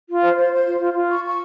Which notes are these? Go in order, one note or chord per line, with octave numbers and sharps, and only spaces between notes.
F4
C5
C5
C5
F4
F4
F4
C#6
C#6